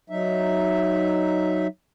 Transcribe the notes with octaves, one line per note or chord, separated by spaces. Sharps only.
F#3 D#4 E5